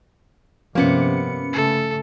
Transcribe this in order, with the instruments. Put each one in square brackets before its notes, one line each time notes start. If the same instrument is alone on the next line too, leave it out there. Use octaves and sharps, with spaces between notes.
[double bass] G2 C3 [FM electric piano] F3 C#4 C#7 [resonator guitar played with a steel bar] A#3 B3
[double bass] C#3 A3 [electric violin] A4